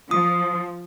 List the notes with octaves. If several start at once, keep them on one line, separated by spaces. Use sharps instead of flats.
F3 D#6